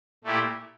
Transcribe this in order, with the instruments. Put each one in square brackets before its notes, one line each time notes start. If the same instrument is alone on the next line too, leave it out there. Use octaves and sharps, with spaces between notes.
[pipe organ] A#2 A3 E4 G4